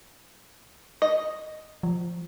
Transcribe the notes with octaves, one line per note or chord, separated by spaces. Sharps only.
D#5
F3